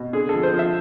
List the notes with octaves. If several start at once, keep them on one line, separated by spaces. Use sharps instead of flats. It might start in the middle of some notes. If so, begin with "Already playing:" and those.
Already playing: B2
D3 G#4
F3 A4
C5
F3
E5